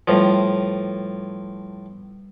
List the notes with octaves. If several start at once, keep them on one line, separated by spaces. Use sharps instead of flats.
A2 F3 G3 B4